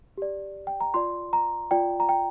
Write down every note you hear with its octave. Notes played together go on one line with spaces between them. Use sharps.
G4 D5
G5
A#5
F4 D5 C6
A#5
F4 D5 G5
A#5
G5